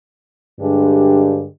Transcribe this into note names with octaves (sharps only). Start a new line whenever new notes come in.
G2 D3 G#3 D4 G4